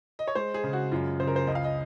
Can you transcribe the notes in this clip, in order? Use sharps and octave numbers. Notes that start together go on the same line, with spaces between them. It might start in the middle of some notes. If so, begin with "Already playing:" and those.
D#5
C#5
G#3 C5
G#4
C#3
F#4
F#2 F4
C#3 C5
A#4
C5
C#2 D#5
F5
D#5